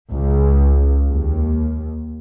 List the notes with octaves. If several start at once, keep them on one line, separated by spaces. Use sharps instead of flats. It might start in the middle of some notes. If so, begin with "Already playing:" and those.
C#2
D#2